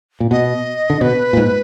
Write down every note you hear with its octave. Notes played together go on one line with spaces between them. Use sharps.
A#2
B2 D#5
D3
B2 B4
A#2
G#2